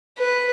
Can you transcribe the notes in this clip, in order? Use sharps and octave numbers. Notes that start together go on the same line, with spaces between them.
B4